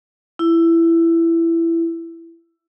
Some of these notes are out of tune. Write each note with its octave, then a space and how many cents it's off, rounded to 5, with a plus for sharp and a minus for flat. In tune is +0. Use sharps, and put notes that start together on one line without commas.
E4 +15